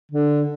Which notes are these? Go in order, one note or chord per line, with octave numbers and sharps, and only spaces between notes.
D3